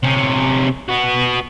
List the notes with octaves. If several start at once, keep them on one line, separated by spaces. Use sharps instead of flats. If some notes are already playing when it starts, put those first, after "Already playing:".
C3 C#4
B3 F#4